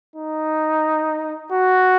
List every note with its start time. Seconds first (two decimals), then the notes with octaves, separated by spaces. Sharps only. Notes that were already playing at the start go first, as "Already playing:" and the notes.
0.16 D#4
1.52 F#4